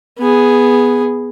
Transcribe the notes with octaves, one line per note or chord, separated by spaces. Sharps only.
B3 G#4